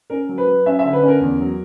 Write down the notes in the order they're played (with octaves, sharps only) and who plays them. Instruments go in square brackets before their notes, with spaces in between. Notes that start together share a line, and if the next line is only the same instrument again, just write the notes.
[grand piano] C#4 A#4
F#3
B4
F#3
C#4 E5
E5
D3
B4
C#4
A#4
E2
F#3